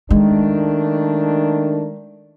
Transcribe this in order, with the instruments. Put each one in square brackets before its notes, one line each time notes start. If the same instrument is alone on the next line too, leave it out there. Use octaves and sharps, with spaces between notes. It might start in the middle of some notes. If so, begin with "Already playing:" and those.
[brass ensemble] D#3 A3 D4 [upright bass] G#3